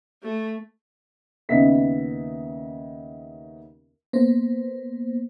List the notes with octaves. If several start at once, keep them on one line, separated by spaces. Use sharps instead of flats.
A3
D#2 C#3 B3 D#5 E5 B6
A#3 B3 C5